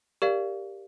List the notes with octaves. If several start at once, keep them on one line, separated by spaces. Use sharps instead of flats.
G4 A#4 D5 F5